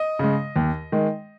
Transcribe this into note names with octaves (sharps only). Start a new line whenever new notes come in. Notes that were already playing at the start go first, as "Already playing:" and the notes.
Already playing: D#5
C#3 G#3
D#2
D#3 G#3